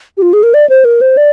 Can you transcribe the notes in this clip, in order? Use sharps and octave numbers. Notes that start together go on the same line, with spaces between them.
G4
F4
G#4
A#4
D5
C5
A#4
C5
D5